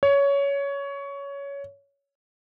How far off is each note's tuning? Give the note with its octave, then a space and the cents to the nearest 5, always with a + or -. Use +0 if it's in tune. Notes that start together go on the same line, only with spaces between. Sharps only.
C#5 +15